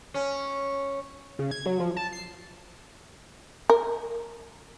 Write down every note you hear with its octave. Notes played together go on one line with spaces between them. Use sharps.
C#4
C#3
G#6
F#3
F3
A5
C7
A#4